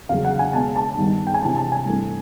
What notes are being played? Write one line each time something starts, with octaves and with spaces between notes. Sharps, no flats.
E2 C#3 F#3 F5
F#5
G#5
B2 G#3 B3 A5
A5
G2 D#3 G3 B3
G5
G#5
C3 E3 G#3 A5
A5
G#5
G2 E3 A3 C4